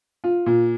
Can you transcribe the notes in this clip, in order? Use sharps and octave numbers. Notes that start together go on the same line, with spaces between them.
F4
A#2